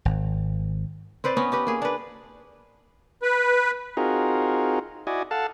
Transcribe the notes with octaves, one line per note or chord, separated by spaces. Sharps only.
G#1
C4 B4 C5 D5
B3 C#4 D#4
D#4 G4 B4
A#3 G#4
D4 B4
B4
C4 D#4 F4 F#4 G#4 A#4
E4 F#4 D5 D#5 G#5
A4 F5 F#5 A5